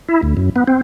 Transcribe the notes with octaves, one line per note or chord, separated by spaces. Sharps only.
E4
D2
F#2
B3
C4